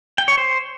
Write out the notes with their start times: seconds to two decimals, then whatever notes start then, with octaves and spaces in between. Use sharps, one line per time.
0.18 G5
0.28 C#5
0.38 C5